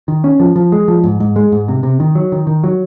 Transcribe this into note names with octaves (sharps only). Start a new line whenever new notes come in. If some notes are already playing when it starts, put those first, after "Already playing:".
D#3
C#4
F3
F3
G#3
F3
G#2
G#2
G#3
G#2
C3
C3
D#3
F#3
D#3
D#3
F#3